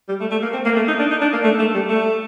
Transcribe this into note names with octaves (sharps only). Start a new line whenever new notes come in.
G3
A3
A3
A#3
C4
A#3
A3
D#4
D4
D#4
D4
A#3
A3
A3
G3
A3